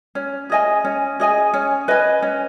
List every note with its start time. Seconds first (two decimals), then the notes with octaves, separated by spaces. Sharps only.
0.15 C#4
0.50 G#4 D#5 G#5
0.85 C#4
1.20 G#4 D#5 G#5
1.54 C#4
1.88 B4 D#5 G#5
2.22 C#4